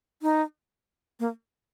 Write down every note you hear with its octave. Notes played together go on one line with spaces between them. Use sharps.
D#4
A#3